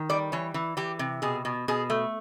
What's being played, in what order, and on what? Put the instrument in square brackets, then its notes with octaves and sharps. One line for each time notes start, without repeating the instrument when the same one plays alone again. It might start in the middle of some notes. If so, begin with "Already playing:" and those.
Already playing: [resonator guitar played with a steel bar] D#3
G3 D5
E3 C#5
E3
E3 G4
C3
B2 G#4
B2
B2 G#4
A3